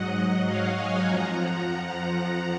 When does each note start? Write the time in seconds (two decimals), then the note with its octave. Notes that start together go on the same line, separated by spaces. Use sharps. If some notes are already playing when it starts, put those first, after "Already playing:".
Already playing: G#2 F#3 D#5 F#5
0.47 C#5 F5
0.77 F5 G#5
1.06 F2 F3 F#5 A#5